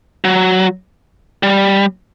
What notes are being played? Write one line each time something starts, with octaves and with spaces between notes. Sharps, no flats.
F#3
G3